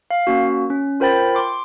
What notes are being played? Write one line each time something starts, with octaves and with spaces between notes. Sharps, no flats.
F5
A#3 C#4 F#4
C#4
F4 A#4 C5 G5 B5 A6
C6 D6